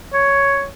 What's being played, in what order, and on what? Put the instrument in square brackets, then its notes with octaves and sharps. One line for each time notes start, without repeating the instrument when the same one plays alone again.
[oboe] C#5